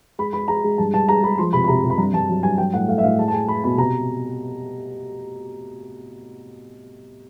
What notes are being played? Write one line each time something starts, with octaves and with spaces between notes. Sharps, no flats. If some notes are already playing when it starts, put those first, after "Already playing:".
G#3 B5
G#3 B5
G#3 A#5
G#3
G2 A5
G2 A5
G#3 A#5
G#3 B5
F3 C6
C3 B5
B5
C3 A#5
C3
B5
G2 A#5
G2 A5
F#3
G2 G#5
F#3 G5
A2 F#5
A3 F5
E5
A2 F5
G#3 A5
A5
G#3 G#5
G#3 B5
B2 B5
C3 A#5